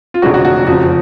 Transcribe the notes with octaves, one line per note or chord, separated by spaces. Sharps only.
F4
F1 F2 D3 G#3 C#4 F#4
F#4
F#4
F#1 F2 C#3 F3 F#4